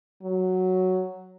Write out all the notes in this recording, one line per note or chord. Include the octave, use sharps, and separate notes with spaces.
F#3